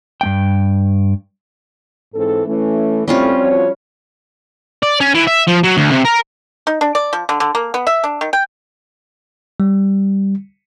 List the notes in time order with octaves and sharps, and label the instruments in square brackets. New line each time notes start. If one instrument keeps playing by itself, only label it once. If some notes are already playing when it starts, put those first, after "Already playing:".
[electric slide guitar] G2 A#3 G5
[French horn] G#2 [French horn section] E3 C4 A4
[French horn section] E3 C#4 [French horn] A3
[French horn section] A2 [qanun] G3 C#4 F4 [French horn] C4
[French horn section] F3 F#4 C#5
[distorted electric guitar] D5
C#4
E3
E5
F3
F#3
D2
C3
A#4
[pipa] D#4
D4
D5
F3
D3
D3
A#3
B3
E5
D4
D#3
G5
[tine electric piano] G3